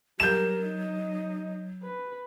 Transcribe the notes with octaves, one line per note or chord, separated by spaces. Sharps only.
F#3 G3 A#4 G6 E7
D#4 D#5
B4